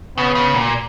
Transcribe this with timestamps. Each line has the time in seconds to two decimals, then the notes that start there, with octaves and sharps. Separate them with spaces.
0.18 C#3 B3
0.35 C#3
0.54 A#2